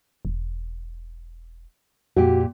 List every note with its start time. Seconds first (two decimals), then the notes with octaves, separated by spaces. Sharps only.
0.25 E1
2.17 F2 A#2 F#4 G4